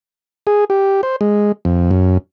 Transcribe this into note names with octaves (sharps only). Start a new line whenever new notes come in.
G#4
G4
C5
G#3
F2
F#2